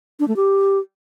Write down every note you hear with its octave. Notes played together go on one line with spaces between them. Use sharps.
D4
A3
G4